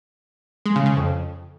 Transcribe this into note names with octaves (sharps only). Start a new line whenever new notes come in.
G#3
C#3
C#3
F2